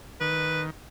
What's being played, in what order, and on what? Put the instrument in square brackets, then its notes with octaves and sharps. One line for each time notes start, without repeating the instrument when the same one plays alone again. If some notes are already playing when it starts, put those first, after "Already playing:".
[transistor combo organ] D#3 [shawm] B4